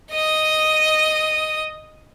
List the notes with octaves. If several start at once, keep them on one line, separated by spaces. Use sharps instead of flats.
D#5 D#6